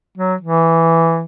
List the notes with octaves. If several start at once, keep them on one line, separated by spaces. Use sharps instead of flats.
F#3
E3